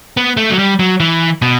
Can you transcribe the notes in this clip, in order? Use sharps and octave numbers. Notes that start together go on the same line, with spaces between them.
B3
A3
F#3
G3
F#3
E3
B2